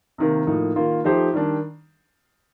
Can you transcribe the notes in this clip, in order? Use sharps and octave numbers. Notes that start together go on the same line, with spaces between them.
C3 D#3 A#3
A2 F3 A#3 D#4
D#3 A#3 F4
F3 A3 D#4 G4 C5
D#3 G3 D4